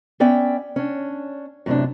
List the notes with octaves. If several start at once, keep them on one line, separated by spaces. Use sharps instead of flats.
B3 C#4 D5 E5 G5
C#4 D4
F#2 A2 C3 C4 D4